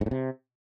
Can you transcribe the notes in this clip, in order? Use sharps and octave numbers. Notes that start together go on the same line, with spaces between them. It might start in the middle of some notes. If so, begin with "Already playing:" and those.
G#2
A2
C3